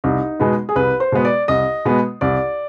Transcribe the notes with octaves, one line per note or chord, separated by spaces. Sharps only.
C2 D#4
B2 G#3 B3
G#4
C2 B4
C5
B2 G#3 B3
D5
C2 D#5
B2 G#3 B3
C2 D5